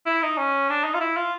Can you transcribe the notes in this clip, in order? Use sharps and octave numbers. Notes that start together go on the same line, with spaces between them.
E4
D#4
C#4
D4
D#4
F4
E4
F4